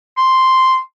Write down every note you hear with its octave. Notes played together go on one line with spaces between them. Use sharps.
C6